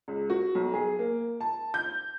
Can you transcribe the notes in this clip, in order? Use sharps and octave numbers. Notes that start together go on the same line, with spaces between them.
C#2
F#4
B1
G#4
A#3
A5
G6